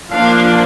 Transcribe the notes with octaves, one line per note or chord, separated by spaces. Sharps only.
F3 A#3 D4 F5